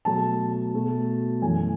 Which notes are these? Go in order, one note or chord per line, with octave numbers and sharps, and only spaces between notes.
B2 F#3 A3 A5
B2 A3
F#2 E3 A3 G#5